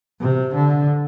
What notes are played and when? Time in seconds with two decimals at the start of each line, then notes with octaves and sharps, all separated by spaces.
0.21 C3
0.55 D3